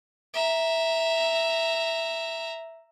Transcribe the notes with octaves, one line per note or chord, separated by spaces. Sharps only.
E5 A#5